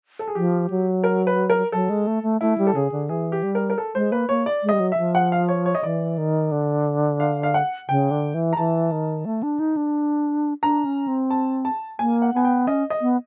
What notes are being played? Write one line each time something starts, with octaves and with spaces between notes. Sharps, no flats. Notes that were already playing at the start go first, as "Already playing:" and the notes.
A4
G#4
F3 G4
F#3
A#4
B4
A#4
F#3 A4
G#3
A3
A3
A3 E4
G3
A4
C#3 G#4
D3
E3 G#4
G4
G3
A#4
A#4
A4
G#3 C5
A#3 B4
A#3 C#5
D5
G#3
G3 D#5
F#3
E5
F3
F#5
F5
C#5
C#5
D#5
E3 D5
D#3
D3
F5
F5
F#5
C#3 G5
D3
E3
A#5
E3 A5
D#3
A3
D4
D#4
D4
D4 A#5
C#4
C4
A5
A5
A#3 G#5
F#5
B3 G#5
G5
C#4 D#5
D#5
B3